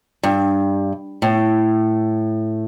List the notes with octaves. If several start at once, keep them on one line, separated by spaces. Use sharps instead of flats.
G2
A2